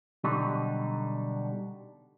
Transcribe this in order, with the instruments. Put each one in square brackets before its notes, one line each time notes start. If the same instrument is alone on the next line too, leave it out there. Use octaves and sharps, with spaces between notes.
[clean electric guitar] B2 D3 F#3 G3 D#4